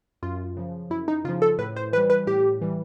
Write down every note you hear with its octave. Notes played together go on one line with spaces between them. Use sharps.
F#2 F4
C#3 F3
F#2 E4
D#4
C#3 F3 F4
A4
A2 B4
C5
E3 G3 B4
B4
A2 G4
E3 G3